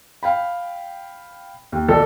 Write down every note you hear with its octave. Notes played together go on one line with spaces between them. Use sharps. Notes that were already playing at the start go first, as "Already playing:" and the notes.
F5 G5 B5
D#2
B1 A4 D5